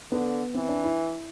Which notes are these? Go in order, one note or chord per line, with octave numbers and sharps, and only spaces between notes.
D3 B3
E3 C4
D4
E4